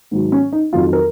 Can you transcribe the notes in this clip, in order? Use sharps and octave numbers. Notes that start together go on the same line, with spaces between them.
G#2 D#3 F#3
C#4
D#4
F2 D#3 F#3 F4
A#4